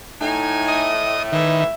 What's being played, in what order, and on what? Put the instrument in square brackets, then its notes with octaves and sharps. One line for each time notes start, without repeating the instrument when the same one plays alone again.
[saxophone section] A2 A3 [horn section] D#4 G#5
[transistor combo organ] D#5
[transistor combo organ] D#3 [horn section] E3 [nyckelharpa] E5